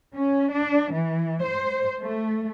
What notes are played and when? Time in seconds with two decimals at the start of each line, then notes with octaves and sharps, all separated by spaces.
0.15 C#4
0.52 D4
0.92 E3
1.42 C5
2.01 A3